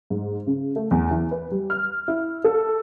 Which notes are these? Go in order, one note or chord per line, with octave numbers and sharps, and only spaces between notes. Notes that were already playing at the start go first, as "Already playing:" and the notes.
G#2
C#3
A3
E2
E3
B4
G3
F6
E4
A4